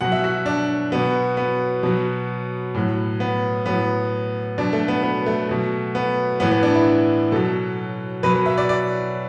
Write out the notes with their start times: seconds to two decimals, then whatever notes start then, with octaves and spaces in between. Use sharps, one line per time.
0.01 B2 F#3 F#5
0.12 E5
0.24 F#4
0.46 D4
0.92 B2 F#3 B3
1.37 B3
1.83 B2 F#3
2.75 A2 F#3
3.20 B3
3.66 A2 F#3 B3
4.58 B2 F#3 D4
4.73 A3
4.88 B3
5.03 B3
5.26 A3
5.49 B2 F#3
5.95 B3
6.40 A2 E3 B3
6.52 B3
6.63 D4
6.75 E4
7.32 B2 F#3 A4
8.23 B2 F#3 B4
8.34 B4
8.46 E5
8.58 D5
8.69 D5